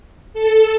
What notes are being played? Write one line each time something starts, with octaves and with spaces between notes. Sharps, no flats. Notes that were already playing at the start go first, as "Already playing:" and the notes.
A4